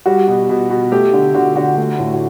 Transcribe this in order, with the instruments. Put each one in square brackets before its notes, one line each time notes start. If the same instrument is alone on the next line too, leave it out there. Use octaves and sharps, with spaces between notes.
[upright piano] G3 F#4
B2
B2
B2
A3 G4
D3
D3 F#4
D3 F#4
A3
A2
F#4